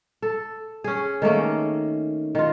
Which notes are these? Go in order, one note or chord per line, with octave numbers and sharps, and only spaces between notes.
A4
C#4 G#4
D#3 A3 A#3 C#4
D#3 F4